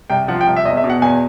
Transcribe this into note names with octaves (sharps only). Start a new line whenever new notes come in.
C2 G5
F3 F#5
G5
C2
E5
E2 D#5
E5
B2
F#5
E2 G#5